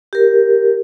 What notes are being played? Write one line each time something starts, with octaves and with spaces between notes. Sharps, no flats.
G4 A#4